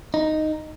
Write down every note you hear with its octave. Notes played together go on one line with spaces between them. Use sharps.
D#4